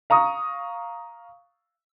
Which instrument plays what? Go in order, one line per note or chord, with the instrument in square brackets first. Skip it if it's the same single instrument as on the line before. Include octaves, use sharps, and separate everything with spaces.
[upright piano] F5 A#5 C#6 D#6